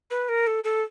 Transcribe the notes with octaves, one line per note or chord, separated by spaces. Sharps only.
B4
A#4
A4
A4